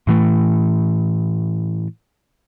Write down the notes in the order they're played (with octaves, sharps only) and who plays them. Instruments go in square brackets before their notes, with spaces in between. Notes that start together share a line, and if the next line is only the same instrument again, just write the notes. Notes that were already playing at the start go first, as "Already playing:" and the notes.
[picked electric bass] A2 E3 A3